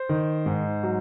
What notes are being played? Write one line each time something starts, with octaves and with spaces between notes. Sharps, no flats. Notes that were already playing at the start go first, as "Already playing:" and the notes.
Already playing: C5
D#3
G#2
F#3